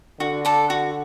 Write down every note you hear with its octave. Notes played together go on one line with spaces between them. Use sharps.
D3 F#4
A4 D5
F#4